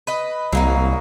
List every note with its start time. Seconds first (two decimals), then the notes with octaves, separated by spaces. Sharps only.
0.07 B4 D#5
0.53 C2 F#3 A#3 D#4